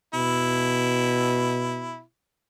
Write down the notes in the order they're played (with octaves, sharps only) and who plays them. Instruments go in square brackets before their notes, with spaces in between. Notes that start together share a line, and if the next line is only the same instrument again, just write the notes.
[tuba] B2 [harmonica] E4